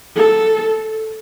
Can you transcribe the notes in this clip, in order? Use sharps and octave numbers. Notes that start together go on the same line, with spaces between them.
A4